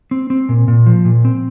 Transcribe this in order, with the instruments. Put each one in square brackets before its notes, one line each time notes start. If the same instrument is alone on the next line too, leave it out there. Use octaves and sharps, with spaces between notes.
[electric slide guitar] C4
C4
A#2
A#2
F3
A#2
C4